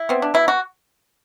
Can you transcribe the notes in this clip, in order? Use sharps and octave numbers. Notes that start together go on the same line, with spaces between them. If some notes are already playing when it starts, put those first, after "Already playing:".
Already playing: E4
B3 C4
D4
B2 E4
F#4